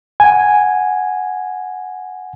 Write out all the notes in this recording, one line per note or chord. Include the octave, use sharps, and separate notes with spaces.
F#5 G#5